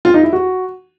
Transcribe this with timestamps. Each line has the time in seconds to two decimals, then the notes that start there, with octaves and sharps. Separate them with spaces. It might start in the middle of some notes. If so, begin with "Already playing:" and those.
0.05 F4
0.14 D#4
0.23 E4
0.33 F#4